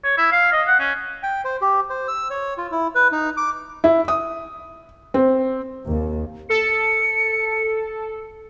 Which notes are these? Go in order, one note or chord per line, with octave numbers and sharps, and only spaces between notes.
C#5
E4
F5
D#5
F#5
C#4
G5
C5
G4
C5
E6
C#5
F4
E4
B4
D#4
D6
E4
D#6
C4
D#2
A4 C#7